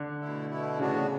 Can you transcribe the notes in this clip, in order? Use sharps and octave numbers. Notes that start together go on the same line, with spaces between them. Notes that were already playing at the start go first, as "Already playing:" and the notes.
Already playing: D3
B2 A3 E4
B2 A3 E4
A2 C#3 E3 B3 D4 F#4
C#3